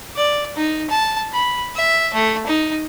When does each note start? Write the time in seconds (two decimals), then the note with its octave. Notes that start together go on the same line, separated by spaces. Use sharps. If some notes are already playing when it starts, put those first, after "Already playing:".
0.16 D5
0.56 D#4
0.90 A5
1.33 B5
1.75 E5
2.13 A3
2.46 D#4